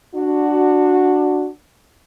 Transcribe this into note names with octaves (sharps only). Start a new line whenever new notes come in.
D4 F#4